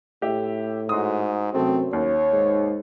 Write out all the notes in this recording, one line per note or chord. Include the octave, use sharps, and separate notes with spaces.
A2 G4 E5
G#2 F#4 C6 D#6
F#2 C3 F#3 A3 C4
D#2 C#5
G#2